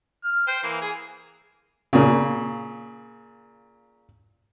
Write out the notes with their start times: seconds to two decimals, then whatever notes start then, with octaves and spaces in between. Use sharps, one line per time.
0.24 F6
0.47 C5 G5
0.63 E3 A#3
0.81 G#4
1.93 A#2 C#3